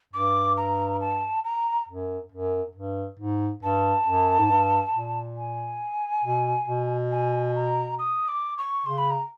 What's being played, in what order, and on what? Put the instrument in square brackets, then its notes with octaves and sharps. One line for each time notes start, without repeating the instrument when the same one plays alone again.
[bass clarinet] G2 [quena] D6
[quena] A#5
A5
A#5
[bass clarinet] F#2
F#2
G2
G#2
[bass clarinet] G2 [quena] A5
[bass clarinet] F#2
G#2
G2
A#2
[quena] G#5
[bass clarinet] B2
B2
[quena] G#5
A#5
D#6
D6
C#6
[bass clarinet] C#3 [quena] C6
[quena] B5
A#5